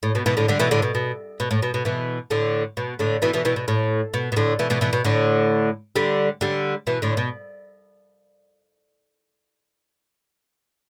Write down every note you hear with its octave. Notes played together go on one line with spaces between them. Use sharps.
A2
B2
B2 E3
A2 D3
D3 G3
B2 E3
A2 D3
B2
B2
B2
A2
B2
B2
B2 E3
A2 D3
B2
A2 D3
B2 E3
B2 E3
B2 E3
B2
A2
B2
B2
A2 D3
B2 E3
B2 E3
B2 E3
B2
A2 D3
D3 G3
D3 G3
B2 E3
A2 D3
B2